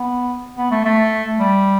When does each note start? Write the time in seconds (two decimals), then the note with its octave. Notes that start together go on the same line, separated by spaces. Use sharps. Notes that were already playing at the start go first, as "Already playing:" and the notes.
Already playing: B3
0.57 B3
0.71 A3
0.85 A3
1.39 G3